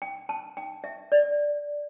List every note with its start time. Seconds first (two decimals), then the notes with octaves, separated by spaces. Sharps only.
0.02 G5
0.29 A5
0.57 G5
0.84 E5
1.12 D5